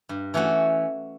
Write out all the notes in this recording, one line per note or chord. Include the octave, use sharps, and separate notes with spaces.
G2
E3 A3 C#4 F#4